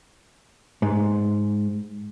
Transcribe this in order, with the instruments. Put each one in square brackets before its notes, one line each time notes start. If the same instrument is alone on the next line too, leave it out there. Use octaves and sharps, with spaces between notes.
[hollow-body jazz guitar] G#2